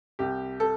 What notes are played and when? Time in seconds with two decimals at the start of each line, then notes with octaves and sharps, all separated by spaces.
0.19 C2 G4
0.60 A4